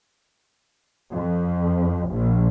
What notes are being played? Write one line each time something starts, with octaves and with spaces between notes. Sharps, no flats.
F2
A#1